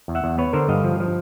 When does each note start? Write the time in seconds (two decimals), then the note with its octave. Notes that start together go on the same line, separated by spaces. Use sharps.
0.08 E2
0.15 E5 F#5
0.24 E2
0.38 B3 B4 C#5
0.53 D3 A#4 C5
0.69 G2 D#5 F5
0.84 F3
1.00 F3